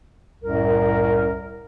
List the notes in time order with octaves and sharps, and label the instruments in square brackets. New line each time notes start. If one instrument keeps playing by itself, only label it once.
[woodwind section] C2 F#2 A2 A#4